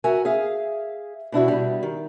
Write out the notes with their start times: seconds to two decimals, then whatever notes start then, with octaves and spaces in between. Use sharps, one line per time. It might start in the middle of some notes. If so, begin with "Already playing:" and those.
0.04 F#4 A#4 E5 F#5 G#5
0.25 G#4 E5 F5
1.32 B2 D4 E4 F#4
1.48 B2 G3
1.83 D#3